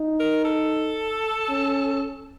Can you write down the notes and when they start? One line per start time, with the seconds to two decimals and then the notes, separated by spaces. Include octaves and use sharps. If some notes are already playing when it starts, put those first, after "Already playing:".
Already playing: D#4
0.20 A#4
0.45 A4
1.49 C#4